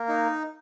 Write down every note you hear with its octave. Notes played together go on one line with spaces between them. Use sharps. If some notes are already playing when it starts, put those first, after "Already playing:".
Already playing: A#3
D#4